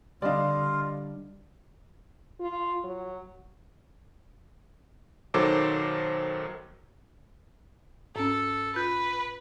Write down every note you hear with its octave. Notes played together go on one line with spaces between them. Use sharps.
D3 G3 D4 F4 D5 D#5 F5
F4
F#3
B1 D#3 F#3 A4 C5 D6
G#2 C#4 A4
F4 B4 F#6 G6